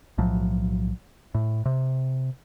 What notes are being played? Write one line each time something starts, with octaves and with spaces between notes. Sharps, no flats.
B1 A2 F3 F#3
A2
C3